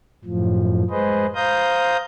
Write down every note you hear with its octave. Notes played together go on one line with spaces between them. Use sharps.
F#2 A2 F3
G#3 G#4 B4 C5 D#5
C5 F5 A#5 D#6 G6